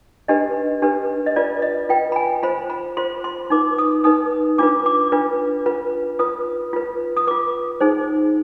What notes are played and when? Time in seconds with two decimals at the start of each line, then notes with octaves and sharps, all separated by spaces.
0.28 D4 G4 B4 D#5
0.82 D4 G4 B4
1.26 D#5
1.36 F4 B4 D5
1.62 D#5
1.89 F4 B4 G5
2.12 B5
2.16 G#5
2.43 F4 C5 B5
2.70 B5
2.97 F4 C5 C6
3.24 C6
3.50 D#4 B4 D6
3.78 D#6
4.04 D#4 B4 D#6
4.58 D4 F4 B4 D6
4.86 D6
5.12 D4 F4 B4
5.66 F4 B4
6.19 F4 B4 D#6
6.73 F4 B4
7.17 D#6
7.27 F4 B4 D6
7.81 D#4 G#4 C5